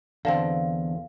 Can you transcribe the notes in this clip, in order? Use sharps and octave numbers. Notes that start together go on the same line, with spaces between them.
E2 D3 C4 F5 A5